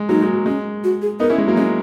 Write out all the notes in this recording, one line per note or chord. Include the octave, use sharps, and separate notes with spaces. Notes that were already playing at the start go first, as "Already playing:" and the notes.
Already playing: G#3
F#3 A#3 D#4
G#3
F#3
G#3 C#4
F#4
G#4
B3 D#4 A#4
C#4 E4
G#3
F#3 A#3
G#3 C#4